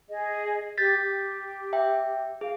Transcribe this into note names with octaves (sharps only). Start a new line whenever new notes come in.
G#4 D#5
G4 G6 A6 B6
G4
E5 G5
G#4 F5